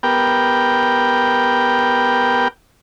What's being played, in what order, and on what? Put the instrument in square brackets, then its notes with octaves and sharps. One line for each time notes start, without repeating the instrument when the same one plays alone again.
[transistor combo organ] B3 G4 A#4 G5